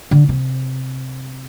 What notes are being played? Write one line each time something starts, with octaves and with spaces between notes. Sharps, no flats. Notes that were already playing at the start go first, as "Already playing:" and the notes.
D3
C3